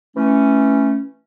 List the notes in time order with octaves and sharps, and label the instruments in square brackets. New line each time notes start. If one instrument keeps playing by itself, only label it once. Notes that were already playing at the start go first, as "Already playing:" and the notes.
[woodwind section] E3 A3 C#4